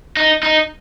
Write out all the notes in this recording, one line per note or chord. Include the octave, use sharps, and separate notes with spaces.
D#4
D#4